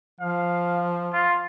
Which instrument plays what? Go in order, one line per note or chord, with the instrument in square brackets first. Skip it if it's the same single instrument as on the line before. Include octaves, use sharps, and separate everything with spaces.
[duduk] F3 [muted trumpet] F5
[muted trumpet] F4